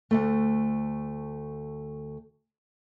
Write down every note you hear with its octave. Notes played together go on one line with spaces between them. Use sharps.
D2 G2 A3